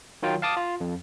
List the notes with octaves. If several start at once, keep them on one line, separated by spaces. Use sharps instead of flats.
D#3 F#3 F4 G5
F5 A5 D6 D#6
F4
F2